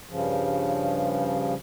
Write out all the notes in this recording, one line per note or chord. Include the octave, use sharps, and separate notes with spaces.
G2 C#3 F3